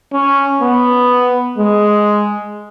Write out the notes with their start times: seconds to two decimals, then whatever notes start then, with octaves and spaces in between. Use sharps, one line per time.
0.13 C#4
0.61 B3
1.58 G#3